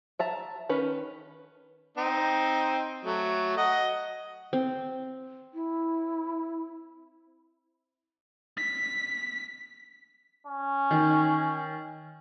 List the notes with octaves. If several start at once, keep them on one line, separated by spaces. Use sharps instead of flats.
E5 A5 A#5
D#3 C#4 B4
C4 D#4
F#3 A3
D#5 F#5
C4
E4
B6
C#4
D#3